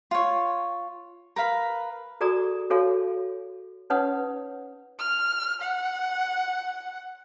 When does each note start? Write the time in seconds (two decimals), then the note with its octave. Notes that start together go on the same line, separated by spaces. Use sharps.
0.11 F4 C#5
1.36 A#4 B4 F5 B5
2.21 F#4 G#4 A4 D5 A#5 D#6
2.70 F#4 G#4 A4 C#5 F5
3.90 C#4 D#4 B4 C#5 F#5 D#6
4.99 F6
5.62 F#5